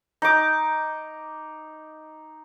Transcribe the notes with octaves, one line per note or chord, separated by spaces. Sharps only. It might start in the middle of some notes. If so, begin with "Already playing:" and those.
D#4 D6